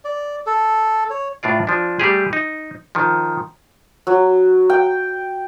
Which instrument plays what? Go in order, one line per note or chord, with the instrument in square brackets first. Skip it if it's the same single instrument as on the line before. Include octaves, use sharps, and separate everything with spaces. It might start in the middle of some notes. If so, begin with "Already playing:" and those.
[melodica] D5
A4
C#5
[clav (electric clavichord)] A2 D4 F4 D5
F3 D4
G3 A3 G4 G#4
D#4
D#3 F3
[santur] F#3
G5